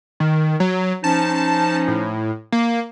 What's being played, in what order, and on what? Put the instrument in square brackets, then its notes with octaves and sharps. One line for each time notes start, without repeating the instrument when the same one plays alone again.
[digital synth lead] D#3
F#3
[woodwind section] F3 C#4 D#4 [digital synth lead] A5
[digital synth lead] A2
A#3